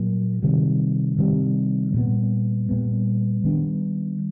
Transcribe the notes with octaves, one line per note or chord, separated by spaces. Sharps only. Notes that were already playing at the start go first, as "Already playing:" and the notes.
Already playing: A#2 F#3 A#3
C3 D#3 G3
C3 D#3 G3
A#2 G3 B3
A#2 G3 B3
D#3 G3 B3 D4